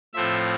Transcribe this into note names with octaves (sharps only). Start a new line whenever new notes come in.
A2 F3 A3 C4 E5